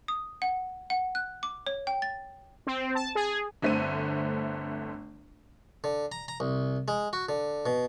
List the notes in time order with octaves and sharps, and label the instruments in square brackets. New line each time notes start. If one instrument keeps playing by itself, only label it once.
[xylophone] D#6
F#5
F#5
F#6
D6
C#5
G5
A6
[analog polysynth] C4
A5
G#4
[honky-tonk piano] G1 D3 A3 C4 D#7
[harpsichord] D3
A#5
A#5
C2
G#3
F#4
D3
B2